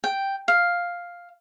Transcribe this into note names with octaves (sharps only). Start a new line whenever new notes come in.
G5
F5